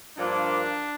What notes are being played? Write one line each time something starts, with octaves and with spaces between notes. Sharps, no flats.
G2 F3 A#3 D4